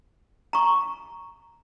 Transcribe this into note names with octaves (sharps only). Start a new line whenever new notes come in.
A#5 C#6